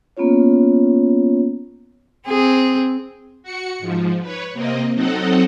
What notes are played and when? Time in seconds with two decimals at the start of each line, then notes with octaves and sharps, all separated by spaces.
0.17 A#3 B3 C#4 F4 C#5
2.28 C4 G#4
3.43 F#4 C#7
3.79 G#2 F3
4.22 B4 C#5
4.53 C3 A#3 C4 D#5
4.94 F#3 C4 D#4 A4 D#5 F#5